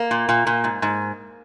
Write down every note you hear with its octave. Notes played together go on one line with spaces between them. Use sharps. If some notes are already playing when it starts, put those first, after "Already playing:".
Already playing: A#3
A#2
A#2
A#2
G#2
G#2